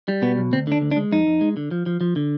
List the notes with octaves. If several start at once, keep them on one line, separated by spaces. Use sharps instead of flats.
G3
B2 B3
B1
D2 C4
D3 D4
D2
D4
G#3
F2 D#4
F2
G#3
D3
F3
F3
F3
D3